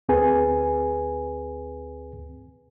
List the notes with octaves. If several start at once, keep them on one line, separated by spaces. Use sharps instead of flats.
D2 C4 G#4 B4 G#5